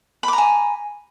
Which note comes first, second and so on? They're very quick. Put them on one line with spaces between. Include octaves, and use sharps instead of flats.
B5 D6 A#5 G#5